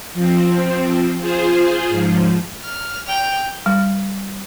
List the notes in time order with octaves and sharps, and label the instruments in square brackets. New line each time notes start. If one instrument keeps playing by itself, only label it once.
[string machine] F3 C4
F4 G#4 C5
G#2 F3
[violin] F6
G5 F7
[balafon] G3